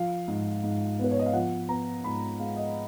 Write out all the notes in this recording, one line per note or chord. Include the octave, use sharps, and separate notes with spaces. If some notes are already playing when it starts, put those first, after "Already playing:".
Already playing: F3 F5
G#2
G#2
B3 B4
C#5
D#5
F5
F3 F#5
B3 A#5
G#2 B5
G#3 F5
D#5